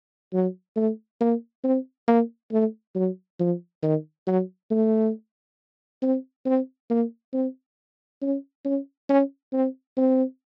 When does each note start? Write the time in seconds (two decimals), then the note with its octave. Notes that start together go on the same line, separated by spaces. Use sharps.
0.33 F#3
0.76 A3
1.21 A#3
1.64 C4
2.08 A#3
2.52 A3
2.95 F#3
3.40 F3
3.82 D#3
4.27 F#3
4.71 A3
6.02 C4
6.45 C4
6.90 A#3
7.33 C4
8.22 C#4
8.65 C#4
9.09 C#4
9.53 C4
9.97 C4